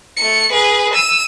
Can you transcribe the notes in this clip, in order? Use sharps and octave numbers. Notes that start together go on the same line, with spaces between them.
A3 C#7
G#4 B4
E6 D#7